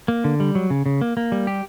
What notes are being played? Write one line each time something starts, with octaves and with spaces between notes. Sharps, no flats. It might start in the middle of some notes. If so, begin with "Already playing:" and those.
A#3
D3
G3
F#3
C#3
C#3
A#3
A#3
G3
G4